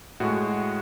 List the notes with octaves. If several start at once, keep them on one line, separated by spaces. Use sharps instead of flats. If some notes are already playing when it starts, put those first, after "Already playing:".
A2 G#3 F#4